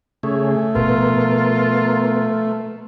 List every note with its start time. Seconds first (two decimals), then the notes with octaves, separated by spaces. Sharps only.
0.23 C#3 A3 G#4 C#5
0.75 B2 F3 B3 F4 A#4